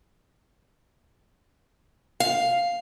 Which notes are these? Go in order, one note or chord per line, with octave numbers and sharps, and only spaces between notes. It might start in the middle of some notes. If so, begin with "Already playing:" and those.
F5